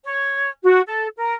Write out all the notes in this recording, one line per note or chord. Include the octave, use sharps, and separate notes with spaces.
C#5
F#4
A4
A#4